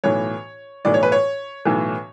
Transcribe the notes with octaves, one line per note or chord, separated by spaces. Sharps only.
B1 A2 E3 C#5
B1 A2 E3 D5
C#5
B4
C#5
B1 A2 E3